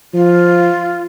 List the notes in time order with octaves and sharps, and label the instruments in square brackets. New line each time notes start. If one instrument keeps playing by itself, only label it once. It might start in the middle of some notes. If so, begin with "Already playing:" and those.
[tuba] F3 [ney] F4